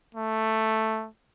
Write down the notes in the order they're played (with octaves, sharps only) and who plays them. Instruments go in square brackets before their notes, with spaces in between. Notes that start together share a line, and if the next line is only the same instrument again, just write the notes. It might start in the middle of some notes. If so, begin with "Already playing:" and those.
[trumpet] A3